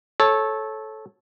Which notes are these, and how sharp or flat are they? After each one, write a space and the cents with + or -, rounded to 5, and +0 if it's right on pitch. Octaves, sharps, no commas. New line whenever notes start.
A4 -15 C#5 -20